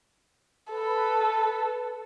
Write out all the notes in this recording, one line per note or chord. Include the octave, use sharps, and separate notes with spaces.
A4 B4